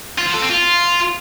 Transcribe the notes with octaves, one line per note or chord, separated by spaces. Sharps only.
F4
F3
A4
C4
F4